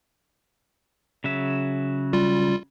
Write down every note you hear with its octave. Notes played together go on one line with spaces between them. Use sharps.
C#3 F#3 E5
G3 F4